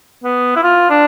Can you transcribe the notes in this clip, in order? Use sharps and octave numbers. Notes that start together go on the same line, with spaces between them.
B3
E4
F4
D4